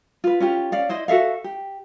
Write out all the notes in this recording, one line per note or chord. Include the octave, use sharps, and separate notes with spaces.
F4 B4
C#4 F4 G4
C#4 D5 F5
E4 C5 D#5
F#4 A4 E5 F5
G4